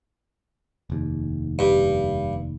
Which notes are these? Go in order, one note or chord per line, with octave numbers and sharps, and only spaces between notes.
F1 D#2
G2